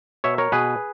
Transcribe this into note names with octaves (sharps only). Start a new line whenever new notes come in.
B2 C#5 E5
A#4 C#5
B2 G#4 B4